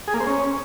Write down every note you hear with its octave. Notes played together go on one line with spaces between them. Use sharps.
G#4
A#3
C5
C#4